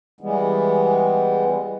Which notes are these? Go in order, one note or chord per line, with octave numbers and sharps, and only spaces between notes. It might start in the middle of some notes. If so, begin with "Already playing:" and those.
E3 G3 G#3 B3